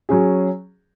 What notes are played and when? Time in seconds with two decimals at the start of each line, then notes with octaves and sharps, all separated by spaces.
0.09 F#3 C#4 G#4